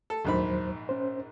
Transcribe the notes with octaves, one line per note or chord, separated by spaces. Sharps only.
A4
A#1 D#2 G#2 F#3 C5 B5
C#4 C5